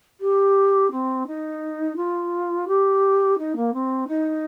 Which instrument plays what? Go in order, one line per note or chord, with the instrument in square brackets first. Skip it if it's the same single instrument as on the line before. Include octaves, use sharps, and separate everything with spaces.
[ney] G4
C4
D#4
F4
G4
D#4
A#3
C4
D#4